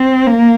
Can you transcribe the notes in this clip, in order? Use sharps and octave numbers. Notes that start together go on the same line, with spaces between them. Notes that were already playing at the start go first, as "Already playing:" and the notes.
Already playing: C4
A#3